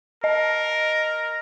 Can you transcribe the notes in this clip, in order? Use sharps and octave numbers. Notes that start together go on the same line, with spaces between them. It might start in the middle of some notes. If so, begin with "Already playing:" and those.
A#4 D#5